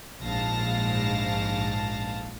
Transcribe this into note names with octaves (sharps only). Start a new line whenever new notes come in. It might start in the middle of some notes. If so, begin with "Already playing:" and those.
A#1 G#2 F5 A5 A#6